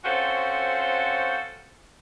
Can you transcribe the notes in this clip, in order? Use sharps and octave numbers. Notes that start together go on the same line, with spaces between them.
C4 C#4 F4 F#4 A4 C5